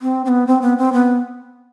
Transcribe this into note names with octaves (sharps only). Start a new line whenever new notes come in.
C4
C4
B3
C4
B3
C4
B3